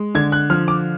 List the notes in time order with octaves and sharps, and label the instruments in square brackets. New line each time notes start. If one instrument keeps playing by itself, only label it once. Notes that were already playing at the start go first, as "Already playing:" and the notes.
Already playing: [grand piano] G#3
D3 G#6
F#6
F3 F6
D6